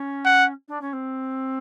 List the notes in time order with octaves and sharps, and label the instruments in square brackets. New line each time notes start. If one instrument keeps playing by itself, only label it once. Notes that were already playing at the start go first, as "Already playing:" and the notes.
Already playing: [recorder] C#4
[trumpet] F#5
[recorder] D4
C#4
C4